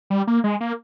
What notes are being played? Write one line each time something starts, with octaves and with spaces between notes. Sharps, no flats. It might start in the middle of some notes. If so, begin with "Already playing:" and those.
G3
A#3
G#3
A#3